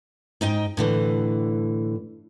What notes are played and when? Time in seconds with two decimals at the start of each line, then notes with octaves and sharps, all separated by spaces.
0.41 G#2 D#4 D#5 G5
0.77 A2 D3 E3